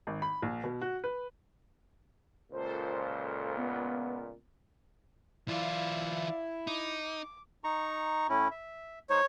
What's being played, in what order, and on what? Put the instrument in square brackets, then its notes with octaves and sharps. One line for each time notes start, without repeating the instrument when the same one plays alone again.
[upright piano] G#1
B5
A#1
B2
F#4
B4
[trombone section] C#2 A#2 [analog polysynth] A4 C5
[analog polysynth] B3
[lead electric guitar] E3 F4 [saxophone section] E4 [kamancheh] D5 F5
[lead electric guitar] D#4 [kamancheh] D6
[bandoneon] D#4 A#5 C#6
A2 C#4 E4
E5
[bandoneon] G#3 D#4 C5 [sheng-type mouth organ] C#5